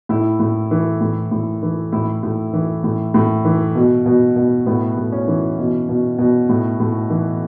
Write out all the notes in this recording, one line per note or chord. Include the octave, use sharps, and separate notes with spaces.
A2 E4
A2
E3
A2
A2
E3
A2 E4
A2
E3
A2
A2
E3
B2
B2
B2
A2 B3
A2
C#4
E3
B2
B2
B2
A2
A2
E3